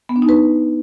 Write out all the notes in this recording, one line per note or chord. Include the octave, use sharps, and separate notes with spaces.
B3
D4
D#4
B4